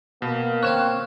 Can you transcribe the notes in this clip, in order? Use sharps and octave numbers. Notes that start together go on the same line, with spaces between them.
B2 A#3
C4 C#5 F5 F#6 E7